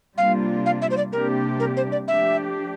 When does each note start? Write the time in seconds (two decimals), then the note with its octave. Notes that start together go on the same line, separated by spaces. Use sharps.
0.18 C3 G3 A#3 D4 F4 F5
0.66 F5
0.82 E5
0.91 C5
0.97 D5
1.13 C3 G3 A#3 D4 G4 A#4
1.60 A#4
1.77 C5
1.92 D5
2.08 F3 A3 D4 G4 E5